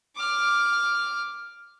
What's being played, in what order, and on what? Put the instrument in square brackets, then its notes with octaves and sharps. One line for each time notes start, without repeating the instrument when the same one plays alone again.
[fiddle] D6 F6